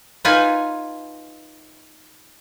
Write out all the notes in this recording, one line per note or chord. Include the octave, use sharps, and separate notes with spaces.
D#4 F4 B4 G#5